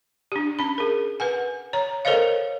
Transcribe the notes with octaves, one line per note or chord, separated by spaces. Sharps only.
D4 G4
C#4 B5
G#4 A#4
B4 F#5 G#5
C#5 A#5
A4 A#4 C5 C#5 D#5 F5